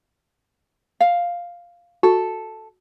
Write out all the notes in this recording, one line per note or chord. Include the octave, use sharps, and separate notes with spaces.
F5
F#4 A4